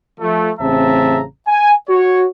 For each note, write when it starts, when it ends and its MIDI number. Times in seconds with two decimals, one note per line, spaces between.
0.20 0.50 53
0.20 0.50 57
0.60 1.22 33
0.60 1.22 49
0.60 1.22 60
0.60 1.22 76
0.60 1.22 81
0.60 1.22 82
1.47 1.73 80
1.89 2.25 66
1.89 2.25 73